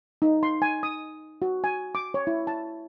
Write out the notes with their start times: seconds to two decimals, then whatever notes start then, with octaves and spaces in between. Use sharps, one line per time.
0.22 D#4
0.43 C6
0.62 G#5
0.83 D#6
1.42 F#4
1.64 G#5
1.95 D6
2.14 C#5
2.27 E4
2.47 A5